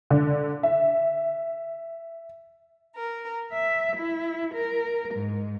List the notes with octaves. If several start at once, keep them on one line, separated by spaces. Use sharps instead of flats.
D3
E5
A#4
E5
E4
A#4
G#2